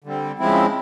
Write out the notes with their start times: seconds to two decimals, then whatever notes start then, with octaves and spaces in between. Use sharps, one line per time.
0.04 D3 G3 C4
0.39 C#3 F3 G#3 C4 E4